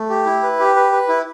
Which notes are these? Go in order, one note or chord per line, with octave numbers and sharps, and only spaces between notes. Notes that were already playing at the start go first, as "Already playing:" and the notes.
Already playing: A3
G4
E4
B4
G4
B4
B4
E4